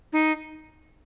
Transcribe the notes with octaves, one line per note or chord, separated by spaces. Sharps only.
D#4